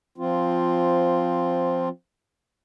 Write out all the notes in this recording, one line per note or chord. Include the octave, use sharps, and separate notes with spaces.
F3 C4 F4